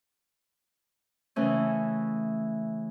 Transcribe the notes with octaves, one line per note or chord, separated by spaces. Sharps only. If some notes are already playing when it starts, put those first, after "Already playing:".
C#3 E3 A3 C#4